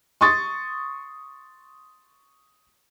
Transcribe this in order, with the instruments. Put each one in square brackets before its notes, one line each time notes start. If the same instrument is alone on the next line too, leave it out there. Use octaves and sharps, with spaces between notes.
[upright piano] C6 C#6 D#6 A6